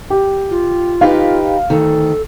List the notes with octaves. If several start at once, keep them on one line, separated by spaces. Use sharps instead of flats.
G4
F4
D#4 G4 B4 F5
D2 D#3 A4